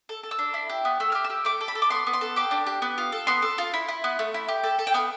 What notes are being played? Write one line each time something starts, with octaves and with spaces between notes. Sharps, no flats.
A4
A4
E6
D4
E4
G4
B3
A3 E6
G4 F6
E6
G4
A3 D6
A4
B5
A4
D6
B3 C6
B3
C6
A4
G4 D6
D4
G4
B3
F4
A4
B3 C6
A4
F4
E4
E4
B3
A3
E4
G4
A4
A4
G5
B3 F5